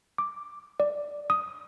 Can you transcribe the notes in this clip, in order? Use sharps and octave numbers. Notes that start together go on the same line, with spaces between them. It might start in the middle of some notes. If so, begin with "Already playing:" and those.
D6
D5
D#6